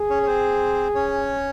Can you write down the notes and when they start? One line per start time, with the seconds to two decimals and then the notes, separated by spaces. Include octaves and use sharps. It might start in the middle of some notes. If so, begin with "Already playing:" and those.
Already playing: G#4
0.10 C#4 C#5
0.23 C#5
0.27 C4 C5
0.95 C#4 C#5